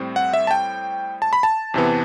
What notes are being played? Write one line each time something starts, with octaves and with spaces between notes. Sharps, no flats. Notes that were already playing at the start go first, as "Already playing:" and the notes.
Already playing: A2 G3 C4
F#5
E5
A5
G5
A5
B5
A5
E2 C3 E3 B3